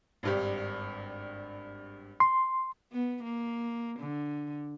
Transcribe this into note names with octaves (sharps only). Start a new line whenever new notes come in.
G#1 G2 G4
C6
B3
A#3
D3